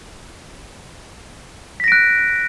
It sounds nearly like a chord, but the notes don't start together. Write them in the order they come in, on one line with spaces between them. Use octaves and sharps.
B6 A#6 D7 F#6